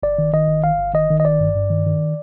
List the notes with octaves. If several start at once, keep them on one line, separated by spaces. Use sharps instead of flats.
G1 D5
D#3
D#3 D#5
G1
G1 F5
G1
D#3 D#5
D#3
D#5
G1 D5
G2
G2
D#3
D#3